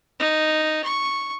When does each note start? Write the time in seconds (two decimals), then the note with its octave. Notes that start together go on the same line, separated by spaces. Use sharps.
0.19 D#4
0.84 C#6